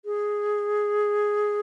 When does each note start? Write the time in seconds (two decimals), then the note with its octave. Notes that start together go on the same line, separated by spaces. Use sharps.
0.05 G#4